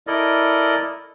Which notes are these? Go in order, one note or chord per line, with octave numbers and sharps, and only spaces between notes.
E4 A4 A#4 D5 D#5